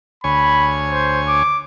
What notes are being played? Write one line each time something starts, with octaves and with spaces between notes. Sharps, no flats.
D2 C#5 G#5 B5
C5
D6